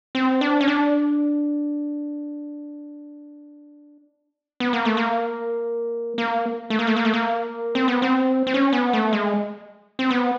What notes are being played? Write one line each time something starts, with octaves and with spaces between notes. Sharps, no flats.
C4
D4
C#4
D4
B3
A#3
A3
A#3
A#3
A3
A#3
A3
A#3
A3
A#3
C4
B3
C4
C4
C#4
B3
A3
G#3
C4
B3